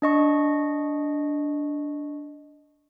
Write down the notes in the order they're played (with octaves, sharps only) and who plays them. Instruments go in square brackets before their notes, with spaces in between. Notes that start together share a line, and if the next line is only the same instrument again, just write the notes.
[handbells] D4 D#5 C#6